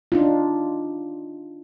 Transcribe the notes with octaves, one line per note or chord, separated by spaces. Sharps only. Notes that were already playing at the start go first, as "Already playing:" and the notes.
D4 D#4 F4